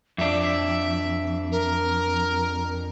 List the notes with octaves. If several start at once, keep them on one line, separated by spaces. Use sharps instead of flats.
F2 D4 E5
A#4